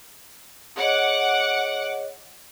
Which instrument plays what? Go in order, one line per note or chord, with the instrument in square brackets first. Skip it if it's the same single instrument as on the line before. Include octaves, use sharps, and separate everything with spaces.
[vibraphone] G#4 C#5 D#5 [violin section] F#5 D6